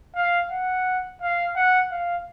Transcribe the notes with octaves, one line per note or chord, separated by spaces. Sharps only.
F5
F#5
F5
F#5
F5